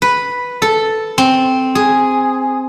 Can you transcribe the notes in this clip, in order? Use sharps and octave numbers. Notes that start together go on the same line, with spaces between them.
B4
A4
C4
G#4